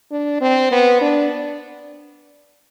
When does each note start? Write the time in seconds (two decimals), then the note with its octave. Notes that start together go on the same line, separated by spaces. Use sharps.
0.11 D4
0.41 C4
0.72 B3
1.01 D4